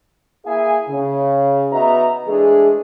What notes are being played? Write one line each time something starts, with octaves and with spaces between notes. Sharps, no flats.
A#3 E4 G#4 E5 F5 G#5
C#3
B3 D#4 F#4 B4 E5 A#5
E3 G#3 A3 D4 G#4